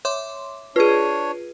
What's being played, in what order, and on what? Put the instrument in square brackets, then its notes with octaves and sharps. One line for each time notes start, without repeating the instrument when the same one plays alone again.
[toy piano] C#5 [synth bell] E5 C6 D6
[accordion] D4 C#5 [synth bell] F4 G#4 [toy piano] B4